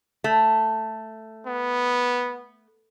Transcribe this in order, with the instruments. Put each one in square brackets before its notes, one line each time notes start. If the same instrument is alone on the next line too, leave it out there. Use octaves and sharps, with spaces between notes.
[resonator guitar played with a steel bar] A3
[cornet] B3